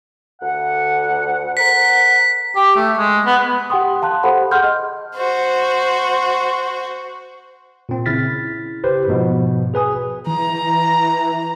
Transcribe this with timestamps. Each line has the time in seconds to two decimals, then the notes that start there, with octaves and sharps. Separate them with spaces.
0.41 D2 F#5
1.57 A#4 C5 F#5 B6
2.56 G4
2.76 A3
2.98 G#3
3.26 B3
3.70 G4 F#5 G5 C6 D#6
4.02 F5 A5 C6 F#6
4.23 G4 A4 C5 F#5 B5
4.51 G#4 F#5 C6 F6 G6
4.63 D#5
5.16 F#4 C5
7.89 A#2 C4
8.06 C#3 E4 F6 A6 B6
8.84 G4 B4 C5
9.08 G#2 B2 F3
9.74 G#4 B4 G#5 D#6
10.27 E3 A#5